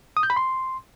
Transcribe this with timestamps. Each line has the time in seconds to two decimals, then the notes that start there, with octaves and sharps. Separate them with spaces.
0.17 D#6
0.23 G6
0.30 B5
0.36 C6